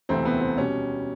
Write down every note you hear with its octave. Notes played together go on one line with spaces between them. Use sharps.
E1 D2 C3 E3 A3 C4
B3
C4
B2 G3 C#4